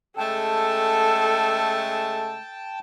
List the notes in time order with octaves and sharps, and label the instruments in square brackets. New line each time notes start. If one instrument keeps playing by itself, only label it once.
[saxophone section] C#3 G#3 A3 [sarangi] A4 [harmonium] G5 A5